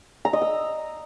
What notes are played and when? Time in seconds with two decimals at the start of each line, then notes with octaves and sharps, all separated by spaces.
0.25 A#5
0.33 D#5
0.42 E6